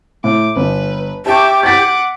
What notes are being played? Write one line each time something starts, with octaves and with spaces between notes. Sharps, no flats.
A2 D6
G1 B4
G4 E5 A5 C#6 D6
F#5 D6 A6 B6